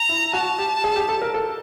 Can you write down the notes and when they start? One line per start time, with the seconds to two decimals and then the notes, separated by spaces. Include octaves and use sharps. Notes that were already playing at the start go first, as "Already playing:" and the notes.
Already playing: A#5
0.09 E4
0.33 F#4 A5
0.59 G4
0.84 G#4
0.96 G4
1.09 A4
1.22 A#4
1.34 A4